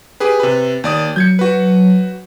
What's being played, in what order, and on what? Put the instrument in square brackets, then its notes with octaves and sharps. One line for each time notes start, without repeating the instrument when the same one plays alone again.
[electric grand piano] G4 G#4 B4
C3 B4
D#2 D5 D#6
[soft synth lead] F#3 [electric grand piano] G6 G#6 C#7
[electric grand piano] F#4 B4